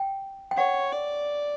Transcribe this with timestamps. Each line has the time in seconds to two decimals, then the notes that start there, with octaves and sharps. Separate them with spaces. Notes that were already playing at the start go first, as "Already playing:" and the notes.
Already playing: G5
0.51 G5
0.57 C#5 F#5
0.91 D5